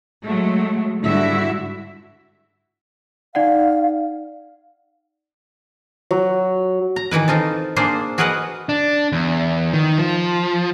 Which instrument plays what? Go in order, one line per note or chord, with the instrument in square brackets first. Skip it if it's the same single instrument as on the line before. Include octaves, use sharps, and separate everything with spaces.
[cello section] F#3 G#3 A3
G#2 D3 G3 E4 F#4 E5
[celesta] D#4 D5 F#5 [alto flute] F5
[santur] F#3
[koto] A#5
D#3 E3 E4 B4
C4 D#4 F4 A4
A#3 D4 G#4 C5
F#4 G#4 A#4 B4 D#5 F#5
[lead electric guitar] D4
E2
D#3
F3